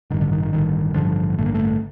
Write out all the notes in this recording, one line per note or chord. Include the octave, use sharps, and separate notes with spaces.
A1 G2 D3 D#3
D3
D#3
D#3
A1 G2 D3 D#3
A1 G2 D3 F3
A1 G2 D3 A3
A#3
A3